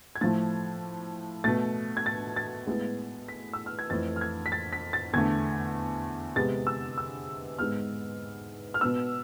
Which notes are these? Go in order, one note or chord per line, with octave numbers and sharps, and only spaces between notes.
G#6
A2 F3 A3 A6
B2 A3 A6
G#6
A6
A6
A2 G#3 B3
B6
E6
F6
G#6
F2 E3 A3 A6
F6
G#6
B6
A6
B6
A6
E2 D3 A3 G#6
C3 G#3 B3 A6
E6
E6
G#2 G#3 B3 F6
F6
B2 B3 E6